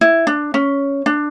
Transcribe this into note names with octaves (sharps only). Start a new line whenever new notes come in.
E4
D4
C#4
D4